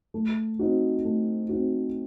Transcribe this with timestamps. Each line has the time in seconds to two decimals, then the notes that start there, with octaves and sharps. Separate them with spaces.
0.14 A3
0.59 C4 D#4 F#4
1.05 A3
1.49 C4 D#4 F#4